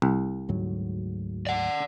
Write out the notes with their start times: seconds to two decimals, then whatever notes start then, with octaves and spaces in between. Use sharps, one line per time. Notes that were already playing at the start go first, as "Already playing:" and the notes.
0.02 C2
0.49 D2 G#2 F#3
1.47 D5 F#5